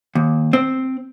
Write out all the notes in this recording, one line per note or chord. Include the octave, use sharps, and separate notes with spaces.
D#2
C4